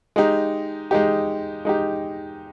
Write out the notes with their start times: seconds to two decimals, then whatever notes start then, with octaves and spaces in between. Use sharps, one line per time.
0.16 G#3 D#4 G4
0.91 G#3 D#4 G4
1.65 G#3 D#4 G4